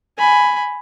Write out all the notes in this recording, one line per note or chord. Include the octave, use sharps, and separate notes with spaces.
G#5 B5